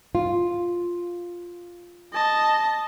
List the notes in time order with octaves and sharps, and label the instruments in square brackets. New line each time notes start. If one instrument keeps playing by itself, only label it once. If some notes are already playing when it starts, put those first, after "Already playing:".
[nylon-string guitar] F4
[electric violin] D#5 A5